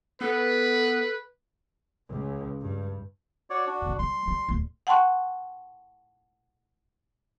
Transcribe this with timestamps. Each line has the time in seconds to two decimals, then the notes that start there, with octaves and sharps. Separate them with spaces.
0.21 B3 A4 B4
2.09 C#2
2.61 G2
3.50 F#4 C#5 D5
3.67 D4 F#4
3.82 F#2 C3
3.99 G3 C6
4.28 G3
4.49 D1 D2
4.87 F#5 G5 A5 C6 C#6 F#6